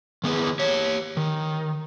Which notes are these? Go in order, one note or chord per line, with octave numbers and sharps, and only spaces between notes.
D#3 B3 G#4 B4
G4 C#5
D#3